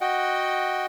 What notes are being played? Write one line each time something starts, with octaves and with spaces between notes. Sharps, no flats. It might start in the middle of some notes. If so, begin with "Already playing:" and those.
F#4 D#5 F#5 G5